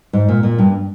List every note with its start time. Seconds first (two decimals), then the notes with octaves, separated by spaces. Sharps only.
0.13 G#2
0.28 A#2
0.43 A#2
0.58 G2